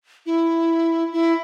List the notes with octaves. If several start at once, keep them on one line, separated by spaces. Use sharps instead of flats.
E4
E4